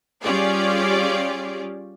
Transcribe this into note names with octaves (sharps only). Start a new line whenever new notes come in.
G3 C#4 F4 G4 G#4 D5